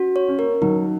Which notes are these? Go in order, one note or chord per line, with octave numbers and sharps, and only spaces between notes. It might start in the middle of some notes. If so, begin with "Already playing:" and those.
Already playing: C#4 F#4
C#5
C#4
A#3 A#4
F#3 D#4